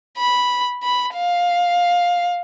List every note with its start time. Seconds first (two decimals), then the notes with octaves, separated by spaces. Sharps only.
0.17 B5
0.83 B5
1.14 F5